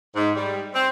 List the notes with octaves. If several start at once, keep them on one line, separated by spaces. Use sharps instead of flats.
G#2
G3
C4